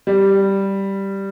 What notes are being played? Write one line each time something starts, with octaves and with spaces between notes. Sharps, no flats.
G3